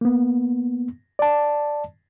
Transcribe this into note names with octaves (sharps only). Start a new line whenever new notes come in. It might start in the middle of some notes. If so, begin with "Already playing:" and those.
A#3 B3
D5 A5